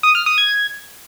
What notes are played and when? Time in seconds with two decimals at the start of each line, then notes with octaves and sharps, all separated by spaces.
0.03 D#6
0.15 F6
0.26 D#6
0.38 G#6